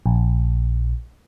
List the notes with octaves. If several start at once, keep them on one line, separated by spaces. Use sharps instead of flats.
A#1